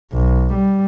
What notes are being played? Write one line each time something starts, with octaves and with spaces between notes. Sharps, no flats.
B1
G3